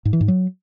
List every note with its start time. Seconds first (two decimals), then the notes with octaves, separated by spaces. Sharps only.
0.05 G#2
0.13 E3
0.21 G#2
0.28 F#3